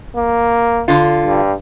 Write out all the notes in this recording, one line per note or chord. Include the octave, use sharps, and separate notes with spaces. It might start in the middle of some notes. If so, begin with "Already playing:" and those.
A#3
D3 F4
G2